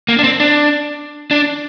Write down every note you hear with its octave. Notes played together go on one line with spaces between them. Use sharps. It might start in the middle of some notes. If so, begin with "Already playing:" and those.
A#3
D4
C4
D4
D4